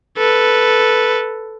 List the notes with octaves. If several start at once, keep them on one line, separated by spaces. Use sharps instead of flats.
A4 B4